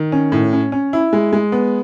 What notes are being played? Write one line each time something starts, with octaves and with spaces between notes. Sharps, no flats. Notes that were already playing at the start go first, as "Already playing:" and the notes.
Already playing: D#3
C#4
A2
C#4
C#4
E4
G#3
G#3
B3